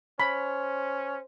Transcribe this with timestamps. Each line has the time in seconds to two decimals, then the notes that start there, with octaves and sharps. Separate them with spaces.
0.20 C#4 C5 B5